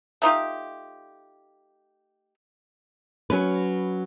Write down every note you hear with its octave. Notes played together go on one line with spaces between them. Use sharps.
A3 D#4 F4 G4
F#3 C#4 B4